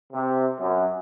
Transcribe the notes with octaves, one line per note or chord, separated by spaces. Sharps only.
C3
F#2